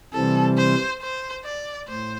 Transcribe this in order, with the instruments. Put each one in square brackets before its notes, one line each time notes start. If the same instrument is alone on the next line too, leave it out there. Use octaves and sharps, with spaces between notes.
[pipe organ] C3 E3 G3 C4 [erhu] A4
[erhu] C5
C5
D5
[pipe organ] A2 [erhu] C5